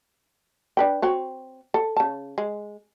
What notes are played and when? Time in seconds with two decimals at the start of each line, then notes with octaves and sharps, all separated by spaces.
0.77 D4 B4 G5
1.02 C4 F#4 C#5
1.74 A4
1.97 C#3 A5
2.38 G#3